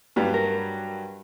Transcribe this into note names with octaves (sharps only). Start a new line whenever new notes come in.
G2 F#3 G3
A#4